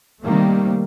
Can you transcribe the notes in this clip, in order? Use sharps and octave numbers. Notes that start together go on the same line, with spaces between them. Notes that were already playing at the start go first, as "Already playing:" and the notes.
C3 D#3 G3 A3 A#3 C4